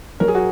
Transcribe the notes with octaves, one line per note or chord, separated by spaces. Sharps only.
F#3 A#4
G#4
F#4